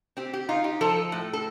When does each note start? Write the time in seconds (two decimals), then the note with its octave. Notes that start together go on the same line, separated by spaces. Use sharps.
0.17 C4 G4
0.33 G4
0.49 D#4 F4
0.64 G4
0.81 F3 A4
1.12 A2
1.33 A4